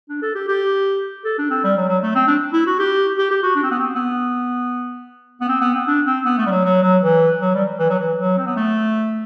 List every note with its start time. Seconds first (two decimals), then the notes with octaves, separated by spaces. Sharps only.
0.09 D4
0.22 A4
0.35 G4
0.49 G4
1.25 A4
1.38 D4
1.50 C4
1.64 G3
1.77 F#3
1.89 F#3
2.03 A3
2.15 C4
2.27 D4
2.53 E4
2.66 F#4
2.79 G4
3.18 G4
3.31 G4
3.43 F#4
3.56 D4
3.63 C4
3.71 B3
3.79 C4
3.95 B3
5.41 B3
5.48 C4
5.61 B3
5.74 C4
5.87 D4
6.06 C4
6.25 B3
6.38 A3
6.46 G3
6.51 F#3
6.65 F#3
6.83 F#3
7.02 E3
7.41 F#3
7.54 G3
7.79 E3
7.90 F#3
7.99 E3
8.19 F#3
8.38 C4
8.47 B3
8.57 A3